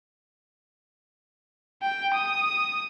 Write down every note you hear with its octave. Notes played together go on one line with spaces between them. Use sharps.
G5
D#6